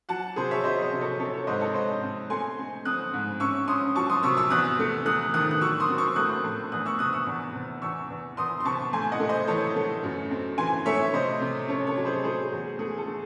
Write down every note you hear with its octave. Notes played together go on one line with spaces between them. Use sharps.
F#3 F#5 A5
C3 G#4 C5
C#5 E5
F#3 C5 D#5
C5 D#5
C3
A4 C#5
C4 A4 C#5
A4 C#5
G#2 C5 D#5
A4 C#5
G#2 C5 D#5
C4
A3 G#5 C6
C4
C4 D#6 F#6
G#2
C#4 C#6 E6
C#4 C6 D#6
F#3 A5 C#6
C6 D#6
C3 C#6 E6
C#6 E6
E2 D#6 F#6
A3
A3 D#6 F#6
D#3 D#6 F#6
F#6
F#3 C#6 E6
C6 D#6
C4
C#6 E6
A2 D#6 F#6
A2
E2 D#6 F#6
C#6 E6
C3 D#6 F#6
C#6 E6
E2
C3
E2 C#6 E6
E2
E2 C6 D#6
C6
C3 A5 C#6
A2 G#5 C6
D#5 F#5
A3
C5 D#5
E3 A4 C#5
A3
F#2
C4
E3 G#5 C6
A3 C#5 E5
C3 C5 D#5
C3
C#4 A4 C#5
A4 C#5
F#3
G#4 C5
A3 G#4 C5
E2
A3 G#4
A4
A3